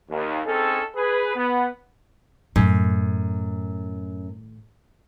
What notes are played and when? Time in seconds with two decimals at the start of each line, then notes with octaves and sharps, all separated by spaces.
0.11 D#2
0.46 C4 C#4 D#4 G#4 A4
0.95 G#4 B4
1.36 B3
2.56 F#2 A2 D#3